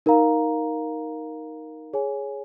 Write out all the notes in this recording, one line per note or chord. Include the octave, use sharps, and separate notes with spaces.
D#4 A#4 F5 A#5
G#4 C#5 G#5